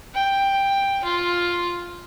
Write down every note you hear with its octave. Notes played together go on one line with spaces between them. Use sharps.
G5
F4